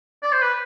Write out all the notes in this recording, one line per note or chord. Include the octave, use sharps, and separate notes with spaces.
D5
C5
B4